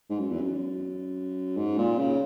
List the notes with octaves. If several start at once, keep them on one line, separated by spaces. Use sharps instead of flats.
G#2
F#2
E2
F#2
G#2
A#2
C#3